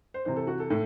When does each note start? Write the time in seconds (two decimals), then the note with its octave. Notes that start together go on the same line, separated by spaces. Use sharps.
0.14 C5
0.25 C3 E3 C5
0.36 A4
0.47 F#4
0.60 A4
0.70 A2 A4